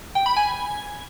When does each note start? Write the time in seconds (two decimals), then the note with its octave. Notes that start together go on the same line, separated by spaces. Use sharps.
0.15 G5
0.26 B5
0.37 G#5